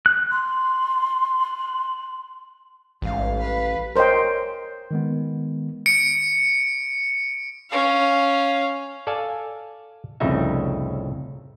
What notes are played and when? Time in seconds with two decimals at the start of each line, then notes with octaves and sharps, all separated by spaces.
0.06 F#6
0.31 C6
3.02 A1 G#2 F5
3.40 B4 F5
3.96 A#4 C5 C#5 D#5 G5
4.91 D#3 G#3 B3
5.86 C#7 D7
7.70 C#4 F5
9.07 A4 D5 F5 G#5 A5
10.20 C2 F2 A2 C#3 D#4 E5